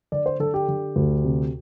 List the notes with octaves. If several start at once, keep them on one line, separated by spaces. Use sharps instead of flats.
D3 D5
C5
D3 A4
G4
D3
D2
C3